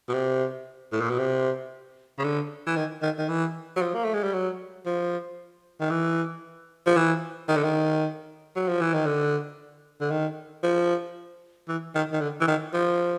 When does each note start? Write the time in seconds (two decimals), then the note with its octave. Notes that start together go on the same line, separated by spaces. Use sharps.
0.09 B2
0.13 C3
0.92 A2
1.01 A#2
1.10 B2
1.19 C3
2.19 C#3
2.24 D3
2.67 E3
2.77 D#3
3.02 D#3
3.18 D#3
3.29 E3
3.76 F#3
3.81 F3
3.94 A#3
4.04 A3
4.14 G#3
4.23 G3
4.33 F#3
4.86 F3
5.80 D#3
5.91 E3
6.86 F3
6.97 E3
7.49 D#3
7.56 D3
7.64 D#3
8.56 F#3
8.68 F3
8.81 E3
8.94 D#3
9.06 D3
10.01 D3
10.11 D#3
10.63 F3
11.69 E3
11.95 D#3
12.12 D#3
12.21 D3
12.41 E3
12.47 D#3
12.73 F3